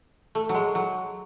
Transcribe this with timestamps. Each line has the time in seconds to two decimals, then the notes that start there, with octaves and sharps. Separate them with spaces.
0.35 A3
0.49 F#3
0.55 G#3
0.75 F#3